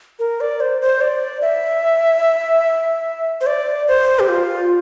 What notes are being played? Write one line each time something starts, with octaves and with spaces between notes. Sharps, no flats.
A#4
D5
C5
C5
D5
E5
C5
D5
C5
G4
F4